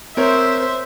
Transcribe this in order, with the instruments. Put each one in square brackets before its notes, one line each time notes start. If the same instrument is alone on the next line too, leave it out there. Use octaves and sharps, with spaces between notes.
[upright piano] C4 A#4 C#5 [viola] C5 E5